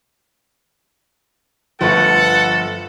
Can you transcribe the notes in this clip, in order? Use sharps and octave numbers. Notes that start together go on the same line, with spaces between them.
G1 F3 A3 A4 B4 F#5 C#6